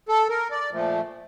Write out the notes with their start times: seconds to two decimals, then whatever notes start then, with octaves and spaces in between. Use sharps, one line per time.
0.09 A4
0.29 A#4
0.51 D5
0.71 A#2 F3 A3